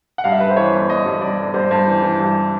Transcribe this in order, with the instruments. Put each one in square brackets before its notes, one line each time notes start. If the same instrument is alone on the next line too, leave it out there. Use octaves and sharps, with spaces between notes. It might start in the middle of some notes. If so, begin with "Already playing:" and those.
[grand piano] F#5
G2 F5
E5
G2 B4
C5
E3 C#5
G1
G1 D#5
G2
G2 D5
G1
G2 C5
G2
E3
E3
G2